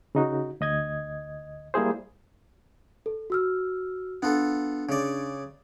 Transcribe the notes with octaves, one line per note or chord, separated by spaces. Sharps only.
C#3 D#4 F#4
D2 D#5 G#6
G3 A#3 E4 G#4 C5
A4
F#4 E6 F6
B3 D4 F4 A4
C#3 D5